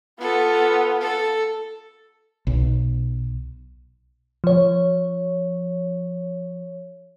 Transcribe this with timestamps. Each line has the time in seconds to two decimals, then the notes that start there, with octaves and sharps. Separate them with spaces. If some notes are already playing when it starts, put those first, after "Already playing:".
0.21 B3 F4 A4
1.01 A4
2.47 B1
4.44 F3 C#5